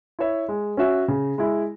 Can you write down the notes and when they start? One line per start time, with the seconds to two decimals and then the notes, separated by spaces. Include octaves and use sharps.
0.19 E4 C#5 E5
0.48 G#3
0.77 C#4 F#4 E5
1.08 C#3
1.38 G#3 E4